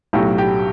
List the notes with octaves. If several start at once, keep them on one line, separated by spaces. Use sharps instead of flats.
B1 A2 F#3 A3 G4
G4